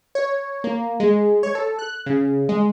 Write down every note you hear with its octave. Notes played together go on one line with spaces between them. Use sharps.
C#5
A#3
G#3
C#5
A4
F#6
C#3
G#3